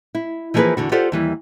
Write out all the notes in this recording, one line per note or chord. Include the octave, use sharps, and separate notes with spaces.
E4
E3 F3 A#3 D4 G#4 B4
E2 D3 F#4
F4 G4 A4 C5 D5 F#5
D#2 E3 G3